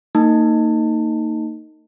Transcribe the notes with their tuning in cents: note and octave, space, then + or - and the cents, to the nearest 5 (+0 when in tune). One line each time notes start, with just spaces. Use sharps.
A#3 -35 D#4 +0 A5 +25